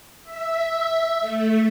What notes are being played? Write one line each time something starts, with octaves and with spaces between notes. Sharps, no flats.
E5
A3